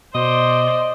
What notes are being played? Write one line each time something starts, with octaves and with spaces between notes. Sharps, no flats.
B2 C5 D5 D#5